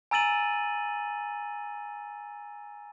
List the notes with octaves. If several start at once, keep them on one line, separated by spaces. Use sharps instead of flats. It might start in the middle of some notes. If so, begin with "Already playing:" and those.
G#5 A#5 E6 A6 D#7 F#7